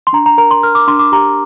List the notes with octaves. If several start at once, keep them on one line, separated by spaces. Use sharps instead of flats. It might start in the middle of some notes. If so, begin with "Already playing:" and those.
C6
D4 A#5
A#5
A#4 A#5
C6
A#4 F6
D6
D4 C6
D6
G4 A#5